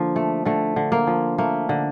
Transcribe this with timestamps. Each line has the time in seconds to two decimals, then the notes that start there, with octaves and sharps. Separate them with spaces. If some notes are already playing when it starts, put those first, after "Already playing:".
Already playing: D3 F3 A#3
0.16 A3
0.45 D3 A3
0.76 D3
0.92 A#3
1.07 F3
1.38 A3 A#3
1.69 D3